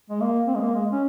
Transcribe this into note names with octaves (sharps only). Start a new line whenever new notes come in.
G#3
A#3
C4
G#3
A#3
G#3
C#4